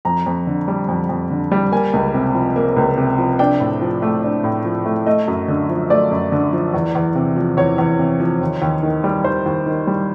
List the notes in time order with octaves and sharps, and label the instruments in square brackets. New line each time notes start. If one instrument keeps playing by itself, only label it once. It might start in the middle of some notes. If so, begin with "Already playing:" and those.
[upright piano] F2 A#5
F2
D3
G3
F2
F2
D3
G3
A#3 G#5
C#2
C3
F3
A#3
C#2
C3
F3
D4 G5
A2
F3
A3
D4
A2
F3
A3
A3 D#5
F#2
D3
F3
A3 D5
F#2
D3
F3
E2
E2
C3
F3
E2 C#5
E2
C3
F3
D#2
D#2
D#3
G3
D#2 C5
D#2
D#3
G3